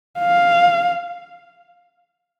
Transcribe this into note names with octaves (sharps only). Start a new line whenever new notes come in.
F5